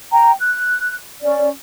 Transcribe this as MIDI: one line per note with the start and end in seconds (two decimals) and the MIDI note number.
0.12 0.32 79
0.12 0.32 82
0.40 0.96 90
1.22 1.48 61
1.22 1.48 74